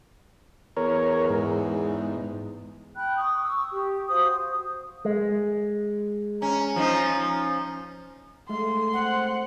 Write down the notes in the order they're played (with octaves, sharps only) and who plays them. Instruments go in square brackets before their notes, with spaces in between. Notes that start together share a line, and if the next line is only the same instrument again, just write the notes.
[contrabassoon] E2 [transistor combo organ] A#4 C#5
[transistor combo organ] G#2
[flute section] G5 B5 F#6
C#6 D#6
C#6 D#6 E6
G4
F#4 C5 F5 D#6
D#6
[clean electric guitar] G#3
[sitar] C#4 [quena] A#5
[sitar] F3 C#4 D#4
[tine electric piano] G#3 A3 [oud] A4 F5 [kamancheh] C6
[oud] C4 [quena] F#5